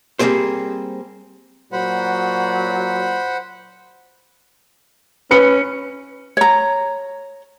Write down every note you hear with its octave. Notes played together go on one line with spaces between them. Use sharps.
G3 A#3 C4 G#4 C5
A#2 F#3 C5 F#5 B5
C#4 B4 C#7
C#5 A#5